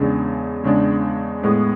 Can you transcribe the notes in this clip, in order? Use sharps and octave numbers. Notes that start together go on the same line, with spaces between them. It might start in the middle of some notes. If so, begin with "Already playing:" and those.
Already playing: E2 C#3 G#3 D4
E2 C#3 G#3 D4
A2 G#3 B3